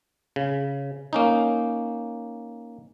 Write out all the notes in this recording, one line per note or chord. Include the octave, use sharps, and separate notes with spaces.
C#3
A#3 C#4 D#4